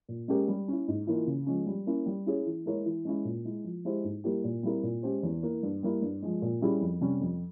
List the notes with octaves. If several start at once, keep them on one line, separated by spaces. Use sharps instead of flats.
A#2
G#3 C#4 G4 A#4
G3
C#4 E4
G#2
E3 A#3 F4
C#3
F3 G#3 C#4
G3
A#3 C#4 E4
G3
C#4 E4 G#4 C#5
E3
G#3 E4 A#4 C#5
E3
G#3 C#4 E4
A#2
G#3 E4
F3
G#3 E4 G4 C5
G#2
G3 A#3 E4 G4
A#2
G3 C4 E4 A#4
A#2
G#3 C#4 G4 C5
E2
E3 A#3
G2
G3 A#3 E4
G2
F3 G#3
A#2
G3 C#4 E4 G#4
F2
C3 G3 C#4
F2